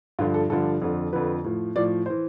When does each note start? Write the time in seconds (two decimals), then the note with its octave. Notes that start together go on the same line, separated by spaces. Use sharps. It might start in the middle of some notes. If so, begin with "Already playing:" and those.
0.19 G2 D3 F3 F4
0.34 A4
0.50 G2 D3 F3 A4
0.82 F2 D3 F3
1.13 F2 D3 F3 B4
1.44 A2 F3
1.75 A2 F3 D5
2.06 E3 C5